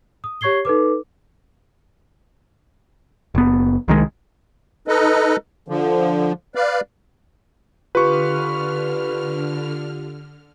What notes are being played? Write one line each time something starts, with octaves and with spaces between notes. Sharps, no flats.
D#6
G4 C#5 C#6 G#6 C7 G7
D#4 A4 B4 D6
F#1 B3
C2 D#3 F3 G#3
D#4 A4 B4 D#5
D3 F3
B4 D5 F5
D3 F4 G4 B4 C#6 F6